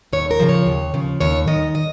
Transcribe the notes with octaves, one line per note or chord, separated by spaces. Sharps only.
D#2 C#5
A#4
C#3 F3
C#5
D#2
C#3 F3
D#2 C#5
D#3 D#5
D#5